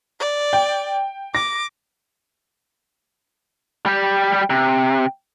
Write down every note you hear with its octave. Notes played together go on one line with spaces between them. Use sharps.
D5
G5
D6 A#6
G3 G4
C3